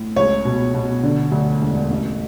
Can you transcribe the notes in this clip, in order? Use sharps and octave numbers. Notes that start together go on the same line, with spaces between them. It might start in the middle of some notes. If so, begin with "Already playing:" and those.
Already playing: A2
C#2 C#5
B2
B2
D3
D2
E1
A1